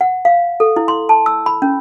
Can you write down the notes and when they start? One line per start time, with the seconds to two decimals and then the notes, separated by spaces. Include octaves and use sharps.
0.01 F#5
0.25 F5
0.60 A4
0.76 E4
0.88 C6
1.09 A5
1.26 E6
1.46 B5
1.62 C#4